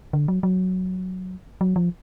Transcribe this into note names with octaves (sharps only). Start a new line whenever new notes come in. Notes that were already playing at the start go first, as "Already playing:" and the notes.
D3
F#3
F#3
F#3
F3